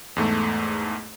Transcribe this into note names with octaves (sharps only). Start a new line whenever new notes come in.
E2 G#2 A3